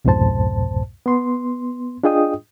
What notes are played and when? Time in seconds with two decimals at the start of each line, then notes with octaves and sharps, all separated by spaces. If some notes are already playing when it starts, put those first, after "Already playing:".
0.05 C2 F2 G#2 B2 C5 A5
1.06 B3 C6
2.04 D4 F4 G#4 D#5 G5 D#6